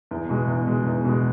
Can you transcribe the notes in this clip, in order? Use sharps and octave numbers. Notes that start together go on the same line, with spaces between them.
E2
B2 G#3
E2
B2 G#3
E2
B2 G#3